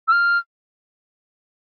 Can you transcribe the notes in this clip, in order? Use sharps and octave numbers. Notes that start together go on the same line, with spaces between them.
E6
F6